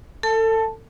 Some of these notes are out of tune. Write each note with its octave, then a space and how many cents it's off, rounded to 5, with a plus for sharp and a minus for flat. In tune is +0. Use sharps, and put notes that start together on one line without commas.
A4 +30 A5 +0